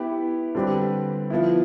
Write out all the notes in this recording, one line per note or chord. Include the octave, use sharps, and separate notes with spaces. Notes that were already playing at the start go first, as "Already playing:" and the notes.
Already playing: B3 E4 G4 B4
D3 G3 C4 G4 B4
F3 B3 E4